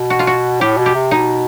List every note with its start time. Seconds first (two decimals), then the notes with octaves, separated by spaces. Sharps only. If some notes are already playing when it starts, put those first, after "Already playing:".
Already playing: B2
0.10 F#4
0.19 F4
0.27 F#4
0.61 A2 G4
0.78 B2
0.86 G4
0.95 C3
1.11 B2 D#4